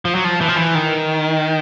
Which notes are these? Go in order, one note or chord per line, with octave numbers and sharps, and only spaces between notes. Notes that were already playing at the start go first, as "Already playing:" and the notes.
F3
F#3
F3
E3
F3
E3
D#3